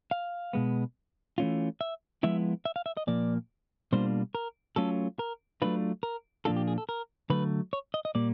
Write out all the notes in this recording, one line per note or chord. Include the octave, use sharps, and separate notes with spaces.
F5
B2 G#3 B3
E3 A3 C#4 F4
E5
F3 G#3 B3 E4 E5
E5
F5
E5
D#5
A#2 F3 A#3 D5
B2 G3 A#3 D4 F4 C5
A#4
F#3 A3 C#4 F4 A4
A#4
F#3 A3 D4 F4 B4
A#4
A#2 F3 A#3 D4 F4 A4
G4
G#4
A4
A#4
D3 F#3 A3 B4
C#5
D#5
D#5
A#2 G3 A#3 D5